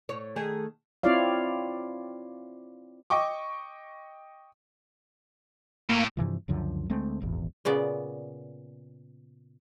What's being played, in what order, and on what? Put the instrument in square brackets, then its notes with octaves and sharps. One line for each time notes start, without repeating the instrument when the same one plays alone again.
[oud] A2 C#5
D#3 A3 G#4
[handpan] C4 E4 F4 C#5 D5 F5
[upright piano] D#5 G5 C#6 D6
[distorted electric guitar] A2 [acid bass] A#3
[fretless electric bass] G2 C3 E3 F3
C#2 F#2 D3 F3
D2 G#3 A3 C4
D#1 G#1 E2
[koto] A#2 C#3 B3 D5